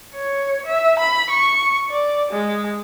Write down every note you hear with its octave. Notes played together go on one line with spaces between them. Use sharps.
C#5
E5
B5
C#6
D5
G#3